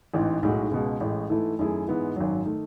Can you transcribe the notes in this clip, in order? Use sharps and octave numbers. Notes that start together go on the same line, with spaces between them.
A1 G#2 E3
B1 A2 G#3 D#4 F#4
C#2 B2 G#3
A1 A2 G#3
G#2 E3 A3 E4 A4
F#2 D#3 A3 E4 G#4
G#2 E3 G#3 B3 E4
G#1 F#2 D#3 F#3
D#3 A3